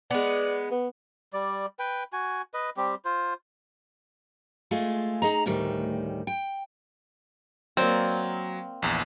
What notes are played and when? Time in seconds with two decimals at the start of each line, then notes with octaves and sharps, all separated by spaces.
0.11 G#3 B3 D5
0.71 B3
1.33 G3 D5
1.79 B4 G5
2.13 F#4 G#5
2.54 B4 D#5
2.77 G3 C4 G4
3.05 F4 C5
4.71 G#3 A3 F4 G#4
5.22 D#4 G#4 A#5
5.46 D2 A2 D#3 G3
6.27 G5
7.77 F#3 A#3 C4 D5
8.82 A#1 E2